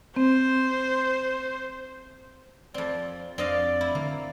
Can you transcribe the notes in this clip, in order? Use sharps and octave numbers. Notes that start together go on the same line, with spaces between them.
C4 C5
F2 C4 D5
F2 C4 D4 D5 D#5 F5
E4
D3 A#3